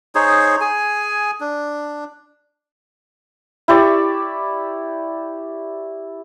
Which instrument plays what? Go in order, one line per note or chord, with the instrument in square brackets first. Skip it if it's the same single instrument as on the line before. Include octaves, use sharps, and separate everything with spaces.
[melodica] D#4 G#4 C5 C#5
G#4 G#5
D4
[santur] E4 G4 D5 C#6